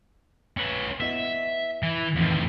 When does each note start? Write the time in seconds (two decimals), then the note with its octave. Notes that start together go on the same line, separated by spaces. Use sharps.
0.57 C#4 B4
1.01 B3 E4 D#5 E5
1.83 E3
2.16 F2 A2 D#3 E3 F5